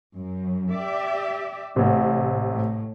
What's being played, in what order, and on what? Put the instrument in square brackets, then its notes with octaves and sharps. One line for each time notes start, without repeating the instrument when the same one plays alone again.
[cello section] F#2
G4 D5 E5
[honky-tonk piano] A1 C3 [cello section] A2
[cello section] A2